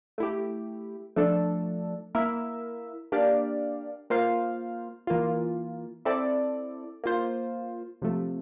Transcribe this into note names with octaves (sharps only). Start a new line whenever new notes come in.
A3 E4 G4
F3 A3 D4 A4
A#3 E4 A#4 E5
A#3 D4 G4 D5 F5
A#3 F4 C5 F5
E3 A#3 F4
C4 E4 A4 D5
A#3 F4 C5
C3 F3 A3